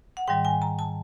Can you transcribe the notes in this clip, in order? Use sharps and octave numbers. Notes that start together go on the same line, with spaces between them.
F#5
G#2 D#3 G3 G5
G#5
A#5
A5